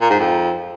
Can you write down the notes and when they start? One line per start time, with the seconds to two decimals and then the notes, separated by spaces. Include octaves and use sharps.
0.01 A#2
0.10 G#2
0.19 F2